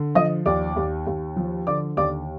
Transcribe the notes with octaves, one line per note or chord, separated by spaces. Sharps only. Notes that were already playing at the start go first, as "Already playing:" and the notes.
Already playing: D3
F3 D#5 D#6
D#2 D5 D6
D#2
D#2
F3
D3 D5 D6
D#2 D5 D6